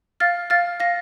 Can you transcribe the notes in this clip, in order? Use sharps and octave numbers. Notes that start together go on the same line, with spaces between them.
F5 F6 A6
F5 F6 A6
F5 A#6